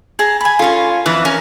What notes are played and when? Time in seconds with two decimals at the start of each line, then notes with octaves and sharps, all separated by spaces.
0.19 G#4 A5 A#5
0.41 G#5 B5
0.59 C#4 F4 A4 C#6
1.06 F2 E3 B4
1.25 C#4 A#4